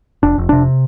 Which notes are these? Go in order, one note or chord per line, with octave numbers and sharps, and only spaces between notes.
F1 D4
F1
C3 D4